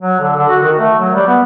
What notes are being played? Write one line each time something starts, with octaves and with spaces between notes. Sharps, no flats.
F#3
D3
D3
F#4
D#3
A3
F#3
G3
B3